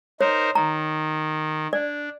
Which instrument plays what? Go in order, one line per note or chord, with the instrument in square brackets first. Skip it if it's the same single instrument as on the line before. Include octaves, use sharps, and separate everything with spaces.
[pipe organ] D#4 A#4 C5 [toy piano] C#5
[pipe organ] D#3 [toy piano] A#5
[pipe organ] D4 [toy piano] D5